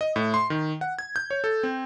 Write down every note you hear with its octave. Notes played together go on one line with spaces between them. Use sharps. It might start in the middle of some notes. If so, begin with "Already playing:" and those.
D#5
A2
C6
D#3
F#5
G#6
G6
C#5
A4
C4